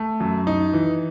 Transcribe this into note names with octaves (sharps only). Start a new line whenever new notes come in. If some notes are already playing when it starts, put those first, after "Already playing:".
Already playing: A3
F#2
D#4
E3